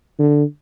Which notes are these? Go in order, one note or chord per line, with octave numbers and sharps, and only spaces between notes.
D3